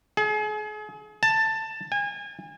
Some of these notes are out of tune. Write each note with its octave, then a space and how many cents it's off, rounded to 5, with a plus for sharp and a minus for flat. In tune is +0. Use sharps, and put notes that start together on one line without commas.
G#4 +35
A5 +10
G#5 -30